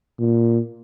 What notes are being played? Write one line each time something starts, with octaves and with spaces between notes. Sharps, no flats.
A#2